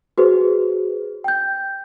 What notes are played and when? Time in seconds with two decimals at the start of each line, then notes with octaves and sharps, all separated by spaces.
0.18 F#4 G#4 B4 C5
1.24 G5 G6